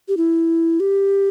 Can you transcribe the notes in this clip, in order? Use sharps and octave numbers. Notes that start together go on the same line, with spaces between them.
G4
E4
G4